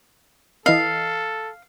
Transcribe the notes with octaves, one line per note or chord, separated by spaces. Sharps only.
E3 A4 D#5 F5 C7